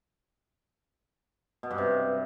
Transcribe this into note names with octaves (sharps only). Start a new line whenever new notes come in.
B2
G2
C3